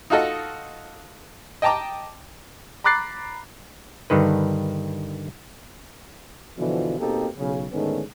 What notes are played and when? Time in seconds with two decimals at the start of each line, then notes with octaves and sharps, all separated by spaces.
0.10 D#4 F4 F#4 A4 D#5
1.62 D#5 G5 A5 A#5 D6
2.84 A#5 B5 D6 F#6 A6 C7
4.10 G2 D3 D#3 B4
6.58 B2 D3 E3 F3
6.99 B2 A#3 C4 D#4 G4 A4
7.37 B1 C#3
7.72 G#2 D3 D#3 A3 B3 C#4